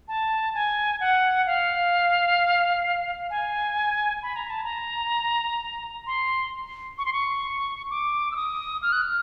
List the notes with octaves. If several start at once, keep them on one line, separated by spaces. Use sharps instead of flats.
A5
G#5
F#5
F5
G#5
B5
A#5
A5
A#5
C6
C#6
C6
C#6
D6
E6
D#6
F6
F#6
F6